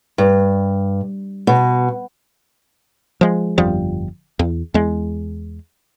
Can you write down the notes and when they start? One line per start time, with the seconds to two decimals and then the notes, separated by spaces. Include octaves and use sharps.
0.18 G2
1.47 B2
3.21 F3 G#3
3.58 G1 F2 F3 G3
4.39 E2
4.74 E2 G#3